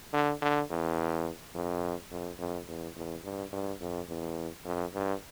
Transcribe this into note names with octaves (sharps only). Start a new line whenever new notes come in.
D3
D3
E2
F2
F2
F2
E2
E2
G2
G2
F2
E2
F2
G2